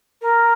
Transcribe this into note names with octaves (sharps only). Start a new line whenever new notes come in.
A#4